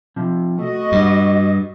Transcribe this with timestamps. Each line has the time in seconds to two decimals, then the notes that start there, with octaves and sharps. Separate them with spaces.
0.16 C3 F3
0.59 A3 F#4 D#5
0.92 G2 G3